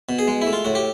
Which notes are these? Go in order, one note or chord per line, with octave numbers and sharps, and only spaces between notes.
B2
G#4
G#3
E4
A3
F4
A2 F#4
G4